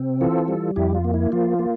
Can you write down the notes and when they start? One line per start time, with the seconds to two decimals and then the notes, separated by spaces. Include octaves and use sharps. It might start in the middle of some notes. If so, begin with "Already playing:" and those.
Already playing: C3 C4
0.21 E3 F4 A4
0.48 G3
0.76 F2 E4 G4
0.94 F4
1.04 A#3
1.14 E4
1.32 F3 F4
1.59 A#3